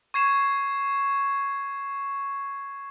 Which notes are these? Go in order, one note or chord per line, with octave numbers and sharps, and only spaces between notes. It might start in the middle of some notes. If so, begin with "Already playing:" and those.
C#6 G#6 C7 E7